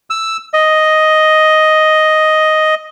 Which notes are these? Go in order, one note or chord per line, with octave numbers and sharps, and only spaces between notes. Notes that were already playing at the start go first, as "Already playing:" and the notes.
E6
D#5